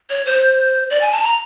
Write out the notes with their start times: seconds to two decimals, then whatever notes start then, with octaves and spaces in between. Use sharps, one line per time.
0.10 C#5
0.25 C5
0.90 D5
1.01 G#5
1.12 A5
1.23 A#5